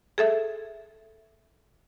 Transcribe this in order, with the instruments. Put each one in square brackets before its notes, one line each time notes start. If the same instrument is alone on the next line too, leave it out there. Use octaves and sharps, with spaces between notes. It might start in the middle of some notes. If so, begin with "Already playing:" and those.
[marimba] G#4 A4 E5